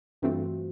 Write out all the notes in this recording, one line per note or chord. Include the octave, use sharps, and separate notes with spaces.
G2 E3 A3 C4 F4 F#4